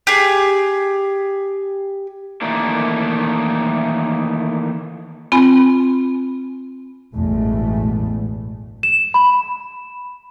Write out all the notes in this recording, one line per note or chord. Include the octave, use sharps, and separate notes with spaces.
G4 G#4
D#3 E3 A3 A#3 D4
C4 F4 G#5 B5
A1 E2 G2 B2 G#3 A3
E7
B5